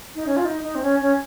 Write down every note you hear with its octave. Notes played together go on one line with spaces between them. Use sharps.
D#4
C#4
F4
D#4
D#4
C4
C#4
C#4